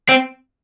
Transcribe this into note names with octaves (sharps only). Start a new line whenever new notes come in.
C4